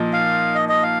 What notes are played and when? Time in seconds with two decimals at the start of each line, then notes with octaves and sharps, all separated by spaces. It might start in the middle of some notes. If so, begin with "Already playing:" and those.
Already playing: A#2 F3 D#4
0.13 F5
0.55 D#5
0.69 D#5
0.83 F5